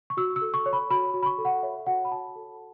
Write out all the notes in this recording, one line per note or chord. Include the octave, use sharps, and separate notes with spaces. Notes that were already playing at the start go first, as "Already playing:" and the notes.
C#6
F#4 E6
E6
A4
C#6
C#5
B5
F#4 B5
F#4
B5
C#6
A4
F#5
C#5 E5
F#4 F#5
B5
F#4 A5
A4